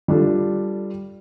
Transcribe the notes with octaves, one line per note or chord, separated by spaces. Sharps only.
G3 D4 F4 A4